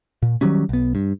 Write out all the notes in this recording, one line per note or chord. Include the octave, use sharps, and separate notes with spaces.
A#2
D#3 F#3 G3 C#4
B1 B3
G2